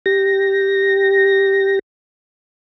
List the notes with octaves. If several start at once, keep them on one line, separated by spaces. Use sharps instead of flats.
G4 A#6